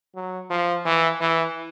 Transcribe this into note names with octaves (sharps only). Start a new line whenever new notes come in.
F#3
F3
E3
E3